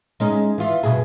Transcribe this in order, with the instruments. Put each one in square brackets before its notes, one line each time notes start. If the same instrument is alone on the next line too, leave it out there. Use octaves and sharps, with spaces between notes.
[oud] G#3 C#4 D#4
E3 F4
G2 B2 G#4